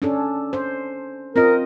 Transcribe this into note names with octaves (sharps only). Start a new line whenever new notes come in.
C#4 D4 A4
C5
C4 F4 A#4 D#5